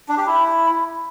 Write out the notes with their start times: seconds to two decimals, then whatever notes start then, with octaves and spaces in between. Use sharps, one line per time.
0.09 D4
0.18 G4
0.26 E4